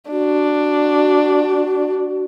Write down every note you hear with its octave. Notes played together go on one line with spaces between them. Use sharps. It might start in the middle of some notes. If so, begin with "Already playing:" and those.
D4 F#4